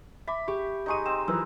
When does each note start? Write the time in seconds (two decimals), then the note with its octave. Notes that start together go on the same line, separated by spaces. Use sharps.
0.27 E5 B5 D6
0.48 G4 C#6
0.86 G#3 D#4 D#5 C#6 D#7
1.06 C4 E7
1.28 E3 F3 A#4 B4 E6